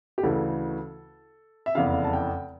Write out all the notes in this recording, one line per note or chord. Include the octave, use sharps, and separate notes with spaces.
G4
D2 C#3 E3 A4
E5
F1 E2 C#3 F5
A5
G5